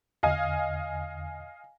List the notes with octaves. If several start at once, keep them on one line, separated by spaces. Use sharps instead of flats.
E2 D3 D#5 F5 G#5